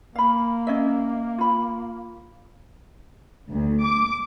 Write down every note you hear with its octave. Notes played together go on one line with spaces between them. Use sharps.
A#3 F5 B5
C#4 D#5 E5
F4 B5
D2
D6